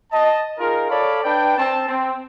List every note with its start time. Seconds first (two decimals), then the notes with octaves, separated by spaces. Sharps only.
0.12 D#5 A5
0.58 D#4 F4 G#4 A#4
0.88 A4 C#5 D5 F5 B5
1.24 D4 B4 G5
1.57 C4 A5
1.87 C4